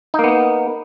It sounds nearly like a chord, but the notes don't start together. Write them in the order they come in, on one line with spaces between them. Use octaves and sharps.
D#4 A#3 B3